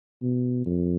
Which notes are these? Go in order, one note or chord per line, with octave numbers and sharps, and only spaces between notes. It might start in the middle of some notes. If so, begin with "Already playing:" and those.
B2
F2